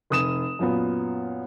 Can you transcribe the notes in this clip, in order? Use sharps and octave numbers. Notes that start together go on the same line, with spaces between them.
F1 D#6 E7
F#2 A#2 B3